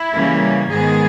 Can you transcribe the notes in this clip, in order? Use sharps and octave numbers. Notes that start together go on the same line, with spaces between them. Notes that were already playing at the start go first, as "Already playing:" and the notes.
Already playing: E4
C#3 E3 G3 A#3 C#4
G#2 D#3 G#3 B3 G#4